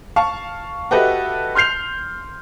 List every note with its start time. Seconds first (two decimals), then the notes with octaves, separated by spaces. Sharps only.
0.16 F5 A5 C#6
0.91 F#4 G4 A4 B4 D#5 E5
1.55 C6 F6 G6 C7 F7